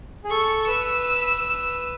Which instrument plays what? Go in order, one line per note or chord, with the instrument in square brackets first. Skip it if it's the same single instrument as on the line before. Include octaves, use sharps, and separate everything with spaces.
[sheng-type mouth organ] G#4
[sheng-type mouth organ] A4 [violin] C#6
[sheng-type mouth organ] B4 [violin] E6
[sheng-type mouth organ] B4